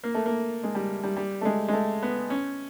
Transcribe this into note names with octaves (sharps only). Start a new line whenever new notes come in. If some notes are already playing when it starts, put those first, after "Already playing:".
A#3
A3
A#3
G#3
G3
G3
G3
A3
G#3
G#3
A3
B3
C#4